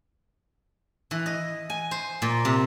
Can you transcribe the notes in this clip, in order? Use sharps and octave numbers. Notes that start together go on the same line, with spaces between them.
E3
D#5
G#5
C5
A#2
C3